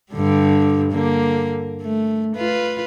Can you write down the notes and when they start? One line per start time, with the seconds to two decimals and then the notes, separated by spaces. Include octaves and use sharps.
0.12 G2 D3 G3
0.92 D3 A#3
1.82 A3
2.36 F4 B4